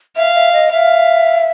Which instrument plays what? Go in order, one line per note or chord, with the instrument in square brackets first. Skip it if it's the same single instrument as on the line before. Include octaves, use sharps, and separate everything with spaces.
[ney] E5 [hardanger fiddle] F5
[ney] E5
D#5
[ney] E5 [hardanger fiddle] F5